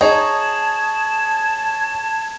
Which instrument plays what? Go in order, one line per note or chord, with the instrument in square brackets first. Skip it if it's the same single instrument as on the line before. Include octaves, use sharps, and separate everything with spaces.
[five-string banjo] D#4 [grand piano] G#4 C#5 [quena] A5 [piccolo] G#6